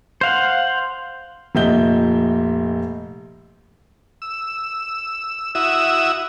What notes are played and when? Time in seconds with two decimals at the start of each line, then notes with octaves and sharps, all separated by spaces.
0.21 C5 F5 F#5
1.55 F1 A#2 D#5 E5 G6 G7
4.22 E6
5.55 E4 F#4 E5 D#6 E6